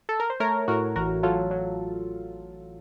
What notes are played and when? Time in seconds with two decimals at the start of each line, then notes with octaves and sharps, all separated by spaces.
0.09 A4
0.20 A#4
0.30 C5
0.40 A3 A#4 C#5
0.68 A2 F#4 A#4
0.96 A1 F#4 A#4
1.23 F#3 F4 A4
1.51 F#3